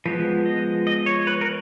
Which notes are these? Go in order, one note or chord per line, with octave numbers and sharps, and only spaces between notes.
F3 G#3 B3 B4
D#5
D#5
C#5
B4
A#4